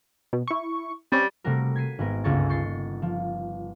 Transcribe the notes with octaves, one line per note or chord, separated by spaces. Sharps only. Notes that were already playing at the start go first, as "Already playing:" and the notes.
B2
E4 C#6
G3 C4 C#4
C3 G3 A3 F#4 A#4
G#6 B6 C7 D#7
G#1 B3 A#4
G1 C#2 A#3 C#6 A6
C#6 G6 A6 C7 C#7
F3